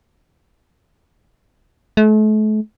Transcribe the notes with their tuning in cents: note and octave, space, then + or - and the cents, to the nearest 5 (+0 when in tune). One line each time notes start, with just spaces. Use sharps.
A3 -40